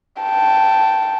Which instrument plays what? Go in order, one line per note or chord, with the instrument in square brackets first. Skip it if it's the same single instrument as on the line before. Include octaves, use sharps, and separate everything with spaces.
[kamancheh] G5 A5